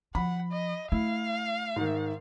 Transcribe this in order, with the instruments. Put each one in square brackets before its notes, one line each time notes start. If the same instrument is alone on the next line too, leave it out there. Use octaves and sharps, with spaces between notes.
[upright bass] F3 [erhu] F#5 [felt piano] B5
[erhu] D#5
[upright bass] A3 [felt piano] E4 [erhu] F5
[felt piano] G#2 D#3